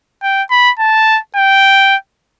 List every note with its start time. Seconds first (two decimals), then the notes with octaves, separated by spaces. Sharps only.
0.23 G5
0.51 B5
0.79 A5
1.36 G5